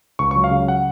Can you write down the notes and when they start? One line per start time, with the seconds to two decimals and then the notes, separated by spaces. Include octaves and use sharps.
0.19 C#2 C#6
0.31 C#6
0.36 F#3
0.44 F5
0.51 C#3
0.68 F#5